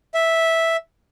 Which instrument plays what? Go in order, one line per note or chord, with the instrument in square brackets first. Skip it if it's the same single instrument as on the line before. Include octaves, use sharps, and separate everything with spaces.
[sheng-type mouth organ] E5